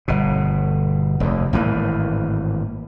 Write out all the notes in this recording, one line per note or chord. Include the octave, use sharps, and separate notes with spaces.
G1 B2
F1 D#2
G#1 A2 E3 A#3